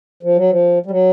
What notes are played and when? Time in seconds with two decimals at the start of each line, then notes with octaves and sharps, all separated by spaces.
0.23 F3
0.37 F#3
0.51 F3
0.86 G3
0.91 F#3